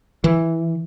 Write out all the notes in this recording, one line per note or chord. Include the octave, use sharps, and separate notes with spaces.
E3